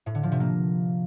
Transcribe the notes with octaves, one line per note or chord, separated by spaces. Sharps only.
A2
D3
F3
C3
A#3